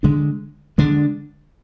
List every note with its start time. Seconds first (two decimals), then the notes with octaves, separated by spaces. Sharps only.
0.03 D3 G#3 D4
0.78 D3 G#3 D4